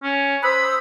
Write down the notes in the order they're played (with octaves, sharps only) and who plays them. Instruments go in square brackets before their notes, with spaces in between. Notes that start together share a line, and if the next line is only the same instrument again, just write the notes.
[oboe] C#4
[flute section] C5 D#6 E6 [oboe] B5